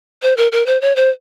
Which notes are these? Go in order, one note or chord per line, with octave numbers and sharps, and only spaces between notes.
C5
A#4
A#4
C5
C#5
C5